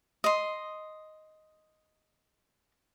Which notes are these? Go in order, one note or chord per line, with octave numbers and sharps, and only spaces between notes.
D#5 C6